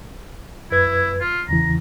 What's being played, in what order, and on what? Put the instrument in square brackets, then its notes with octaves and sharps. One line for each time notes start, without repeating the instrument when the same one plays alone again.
[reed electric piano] F#2 B4 G#6 [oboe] E4
[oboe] F4
[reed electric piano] E2 C#3 E3 [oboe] A#5